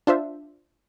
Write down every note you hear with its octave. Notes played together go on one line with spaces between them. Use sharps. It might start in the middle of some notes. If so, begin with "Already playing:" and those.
D4 F4 C5 E5